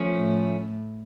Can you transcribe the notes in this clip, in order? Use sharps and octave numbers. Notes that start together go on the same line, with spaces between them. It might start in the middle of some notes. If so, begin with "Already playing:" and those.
Already playing: F3 A3 C#4
A2